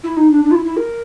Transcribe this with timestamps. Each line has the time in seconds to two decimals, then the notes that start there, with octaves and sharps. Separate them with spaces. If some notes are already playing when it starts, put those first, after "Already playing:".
0.04 E4
0.17 D#4
0.31 D4
0.45 D4
0.51 F4
0.55 E4
0.65 E4
0.77 A#4